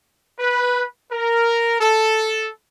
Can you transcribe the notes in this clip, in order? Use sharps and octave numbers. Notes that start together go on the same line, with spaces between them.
B4
A#4
A4